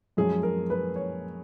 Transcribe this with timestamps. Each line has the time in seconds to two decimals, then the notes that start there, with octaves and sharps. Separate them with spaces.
0.17 F#2 F3 G#3 G#4
0.43 A#4
0.70 B4
0.96 C#5